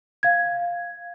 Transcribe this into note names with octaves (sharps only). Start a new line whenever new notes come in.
F5 G#6